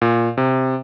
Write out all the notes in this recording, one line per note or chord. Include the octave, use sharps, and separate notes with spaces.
A#2
C3